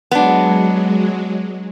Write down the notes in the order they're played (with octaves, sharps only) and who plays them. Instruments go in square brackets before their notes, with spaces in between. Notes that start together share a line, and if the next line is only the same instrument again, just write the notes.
[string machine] F#3 G#3 [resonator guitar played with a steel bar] B3 D4